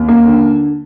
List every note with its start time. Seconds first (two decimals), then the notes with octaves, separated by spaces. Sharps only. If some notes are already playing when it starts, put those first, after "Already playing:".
Already playing: D#2
0.08 A#3
0.26 D3